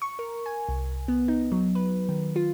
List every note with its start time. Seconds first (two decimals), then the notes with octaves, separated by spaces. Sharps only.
0.02 C#6
0.19 A#4
0.46 G#5
0.69 C2
1.08 B3
1.28 D#4
1.52 F#3
1.75 B4
2.09 D#3
2.36 F4